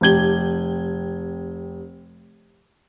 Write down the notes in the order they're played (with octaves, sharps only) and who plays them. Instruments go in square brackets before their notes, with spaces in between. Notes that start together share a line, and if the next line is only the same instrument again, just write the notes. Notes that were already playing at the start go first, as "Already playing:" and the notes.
[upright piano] F1 G4 G#6 G7